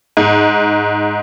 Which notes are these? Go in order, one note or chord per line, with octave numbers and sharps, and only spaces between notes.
G#2